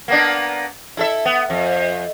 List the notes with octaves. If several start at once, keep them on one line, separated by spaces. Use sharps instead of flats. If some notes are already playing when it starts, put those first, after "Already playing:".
A#3 B3 D4
E4 A4 E5
B3
F2